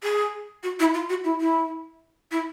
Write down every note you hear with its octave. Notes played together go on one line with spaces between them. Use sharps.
G#4
F#4
E4
F4
F#4
E4
E4
E4